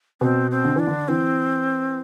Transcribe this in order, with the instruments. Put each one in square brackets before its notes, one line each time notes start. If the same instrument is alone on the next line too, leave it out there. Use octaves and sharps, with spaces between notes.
[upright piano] B2 [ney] C4
[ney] C4
[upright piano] D3
[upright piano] E3 [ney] D4
[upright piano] D3
[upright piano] E3 [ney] C4